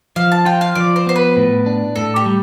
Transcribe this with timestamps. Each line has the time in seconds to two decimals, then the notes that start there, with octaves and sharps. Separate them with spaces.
0.16 F3 F5
0.32 A5
0.45 F4 G5
0.61 F5
0.75 F3 D5
0.96 C5
1.07 B3 C5
1.16 B4
1.36 A2
1.66 D4
1.96 A2 A4
2.16 G4
2.26 G3